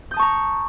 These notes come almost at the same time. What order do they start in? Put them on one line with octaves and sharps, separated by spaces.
G6 D#6 A5 C#6 A#5